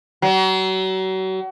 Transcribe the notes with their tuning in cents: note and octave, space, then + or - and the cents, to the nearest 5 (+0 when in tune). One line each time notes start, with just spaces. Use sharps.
F#3 +35